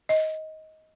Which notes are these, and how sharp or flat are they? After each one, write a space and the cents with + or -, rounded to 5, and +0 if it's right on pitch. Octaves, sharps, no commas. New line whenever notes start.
D#5 +15